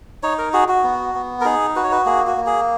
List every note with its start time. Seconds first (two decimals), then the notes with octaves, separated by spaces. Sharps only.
0.23 D#4 C#5
0.38 A#4
0.53 F#4 G#4
0.68 F#4
0.84 B3
1.15 B3
1.41 A#4
1.45 D#4 G#4
1.76 F#4 B4
1.84 C#5
1.92 B4
2.06 A#3 G#4
2.27 F#4
2.37 A#3
2.46 G#4